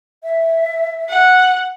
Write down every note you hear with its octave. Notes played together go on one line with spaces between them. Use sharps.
E5
F#5